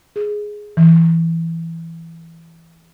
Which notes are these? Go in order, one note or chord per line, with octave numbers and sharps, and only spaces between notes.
G#4
E3